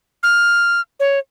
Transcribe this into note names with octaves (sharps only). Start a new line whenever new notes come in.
F6
C#5